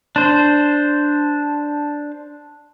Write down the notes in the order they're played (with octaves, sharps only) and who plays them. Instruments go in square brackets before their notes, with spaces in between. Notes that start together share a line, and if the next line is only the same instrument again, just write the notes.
[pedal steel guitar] D4 C5